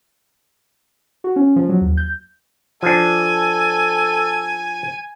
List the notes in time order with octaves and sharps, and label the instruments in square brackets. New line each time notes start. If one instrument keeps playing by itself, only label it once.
[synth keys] F#4
C#4
F3
F#3
D#2
G6
[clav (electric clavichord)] F3 D4 [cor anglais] A4 [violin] G#5